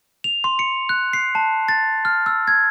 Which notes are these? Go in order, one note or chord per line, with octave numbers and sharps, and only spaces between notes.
F7
C6
C#7
F#6
C7
A5
A6
F6
E6
G#6